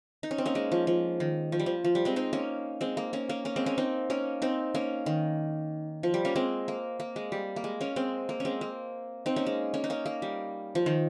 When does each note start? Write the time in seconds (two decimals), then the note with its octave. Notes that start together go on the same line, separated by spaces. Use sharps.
0.23 D#4
0.31 C#4
0.38 C4
0.46 A#3 C#4
0.55 G#3
0.72 F3
0.87 F3
1.20 D#3
1.52 F3
1.60 G3
1.66 F3
1.84 F3
1.95 G3
2.05 G#3 C4
2.16 C4 D#4
2.33 A#3 C#4
2.81 G#3 C4
2.97 A#3
3.13 A#3 C#4
3.29 A#3 C#4
3.45 A#3 C#4
3.56 G#3 C4
3.66 A#3 C#4
3.78 C4 D#4
4.10 A#3 C#4
4.42 C4 D#4
4.75 A#3 C#4
5.06 D#3
6.03 F3
6.14 G3
6.25 A#3 C#4
6.36 G#3 C4
6.68 A#3
7.00 A#3
7.16 G#3
7.32 G3
7.56 A#3
7.64 G#3
7.81 A#3 C#4
7.96 G#3 C4
8.29 A#3
8.40 G#3 C4 C#4
8.61 A#3
9.26 C4 D#4
9.36 A#3 C#4
9.47 G#3
9.74 A#3 C#4
9.84 D#4
9.90 A#3 C#4
10.06 A#3
10.22 G3
10.75 F3
10.86 D#3